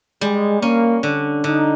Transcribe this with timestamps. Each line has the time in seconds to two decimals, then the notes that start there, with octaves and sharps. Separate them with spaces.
0.21 G3 G#3
0.62 A#3 C#4
1.03 D3
1.44 D3 D#4